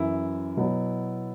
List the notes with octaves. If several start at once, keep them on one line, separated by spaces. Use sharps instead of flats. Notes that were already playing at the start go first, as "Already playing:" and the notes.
Already playing: F#2 E3 E4
B2 F#3